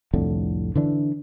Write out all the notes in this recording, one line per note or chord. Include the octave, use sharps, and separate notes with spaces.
C2 F2 A2 D3
D3 E3 D4